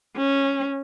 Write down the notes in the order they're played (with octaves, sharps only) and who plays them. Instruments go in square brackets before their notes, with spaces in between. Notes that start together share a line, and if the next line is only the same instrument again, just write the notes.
[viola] C#4